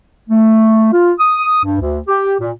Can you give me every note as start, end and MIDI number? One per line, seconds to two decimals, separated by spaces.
0.29 0.91 57
0.92 1.12 65
1.19 1.63 87
1.64 1.80 43
1.80 1.99 38
2.07 2.34 67
2.40 2.51 46